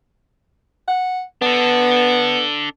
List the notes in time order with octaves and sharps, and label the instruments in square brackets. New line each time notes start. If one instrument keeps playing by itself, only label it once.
[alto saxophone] F#5
[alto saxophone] B3 [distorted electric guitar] D4 A4